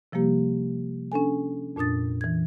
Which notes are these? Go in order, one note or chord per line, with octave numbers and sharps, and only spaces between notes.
C3 F3 G3 A#3 G4
C#4 D4 A4 G#5
F2 A#2 D4 D#6 A6
E3 G#6